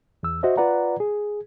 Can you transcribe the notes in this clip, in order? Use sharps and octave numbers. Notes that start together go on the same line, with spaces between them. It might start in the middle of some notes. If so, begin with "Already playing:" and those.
E2 E6
F#4 C5 D#5 E5
F4 B4 D5 F#5 A#5
G#4